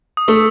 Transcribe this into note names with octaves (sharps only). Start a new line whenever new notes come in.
D#6
A3 E6